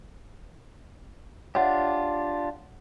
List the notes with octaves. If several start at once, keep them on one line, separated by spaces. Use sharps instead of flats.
D4 F4 G4 C#5 E5 F#5